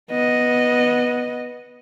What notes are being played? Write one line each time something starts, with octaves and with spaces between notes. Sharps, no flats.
B3 D#5